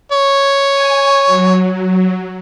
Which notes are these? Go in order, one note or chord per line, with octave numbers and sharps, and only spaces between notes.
C#5
G#5
F#3